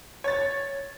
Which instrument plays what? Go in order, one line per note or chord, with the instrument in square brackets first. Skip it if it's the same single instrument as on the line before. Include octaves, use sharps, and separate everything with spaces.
[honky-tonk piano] C#5 A6